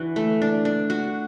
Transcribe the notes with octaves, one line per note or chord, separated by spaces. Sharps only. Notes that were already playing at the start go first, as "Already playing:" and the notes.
Already playing: E3 D4 F#4
A3
D4
D4
F#4